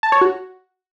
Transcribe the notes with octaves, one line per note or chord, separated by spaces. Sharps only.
A5
C#5
F#4